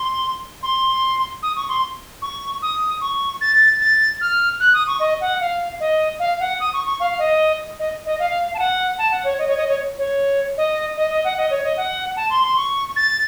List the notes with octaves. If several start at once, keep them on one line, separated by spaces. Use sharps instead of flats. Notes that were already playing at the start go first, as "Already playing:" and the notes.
Already playing: C6
C6
D#6
C#6
C6
C#6
D#6
C#6
A6
A6
F6
F#6
D#6
C#6
D#5
F#5
F5
D#5
F5
F#5
D#6
C#6
C#6
F5
D#5
D#5
D#5
F5
A5
F#5
A5
F#5
C#5
D#5
C#5
D#5
C#5
C#5
D#5
D#5
D#5
F#5
D#5
C#5
D#5
F#5
A5
C6
C6
C#6
A6